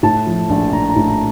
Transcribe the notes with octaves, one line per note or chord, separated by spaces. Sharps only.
A2 A5
F3
A#1
A#1 A#5
A#5
A2
A#5